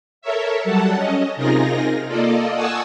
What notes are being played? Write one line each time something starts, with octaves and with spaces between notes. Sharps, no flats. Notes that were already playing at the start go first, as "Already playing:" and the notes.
A4 A#4 C#5 E5
F#3 G3 A4 F#5 A5
C#4 D#5
C3 D#4 F4 G#4 A#4 A#6
A#3 F4 A4 D5 D#5
F#5 G#5 A5 C#6 D#6 E6